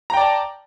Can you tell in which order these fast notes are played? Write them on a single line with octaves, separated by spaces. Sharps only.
A#5 G5 D5 A5